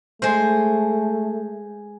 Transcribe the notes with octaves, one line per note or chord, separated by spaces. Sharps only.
G#3 A3 C5